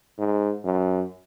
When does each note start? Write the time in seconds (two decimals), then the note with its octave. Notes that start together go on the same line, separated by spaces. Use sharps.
0.18 G#2
0.65 F#2